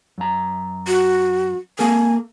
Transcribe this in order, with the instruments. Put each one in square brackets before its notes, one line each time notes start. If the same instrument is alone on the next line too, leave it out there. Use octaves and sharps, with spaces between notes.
[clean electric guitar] F#2 A#5
[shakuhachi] F#4
[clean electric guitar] A#3 A4 A#4 [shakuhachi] G#5